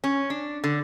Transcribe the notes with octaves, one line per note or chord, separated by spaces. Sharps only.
C#4
D4
D3